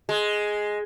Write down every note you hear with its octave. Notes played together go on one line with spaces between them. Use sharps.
G#3